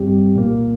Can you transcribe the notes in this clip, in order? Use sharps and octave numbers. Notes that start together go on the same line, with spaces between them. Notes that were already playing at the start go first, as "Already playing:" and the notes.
Already playing: G2 G3 C4 G4
C2 A#2 A#3